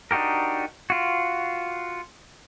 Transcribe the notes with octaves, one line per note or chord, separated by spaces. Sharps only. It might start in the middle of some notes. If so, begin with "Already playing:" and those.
D4 D#4 F#4 G4 A#4
F4 F#4